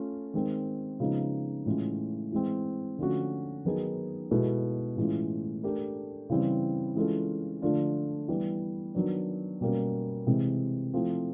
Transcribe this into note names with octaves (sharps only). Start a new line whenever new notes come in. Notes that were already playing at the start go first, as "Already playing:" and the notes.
Already playing: A3 C#4 F4
D#3 G#3 C4
C#3 F3 G#3 B3 D#4
A2 E3 G#3 C#4 F4
E3 G#3 C4
D3 F3 A3 C#4 F#4
D#3 F#3 B3 D#4 G#4
B2 G#3 B3 E4 A4
A2 E3 G#3 C#4 F4
A3 D4 G4 A#4
C#3 E3 G3 C4 E4
E3 G#3 C#4 F4 A4
D3 F3 A3 D4 F4
E3 G3 B3
D#3 F#3 B3 D4
B2 G3 A#3 C#4
C3 E3 G#3 C4
F3 A3 C4 E4